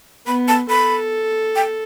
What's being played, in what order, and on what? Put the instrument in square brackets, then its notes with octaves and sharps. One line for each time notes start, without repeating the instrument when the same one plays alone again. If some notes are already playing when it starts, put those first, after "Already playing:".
[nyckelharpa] B3 [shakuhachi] B5
[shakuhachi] A5
[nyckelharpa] A4 [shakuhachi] B5
[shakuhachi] G5